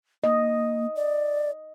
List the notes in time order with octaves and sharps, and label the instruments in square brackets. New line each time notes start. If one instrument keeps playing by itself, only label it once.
[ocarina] A#3 [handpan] D#5
[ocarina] D5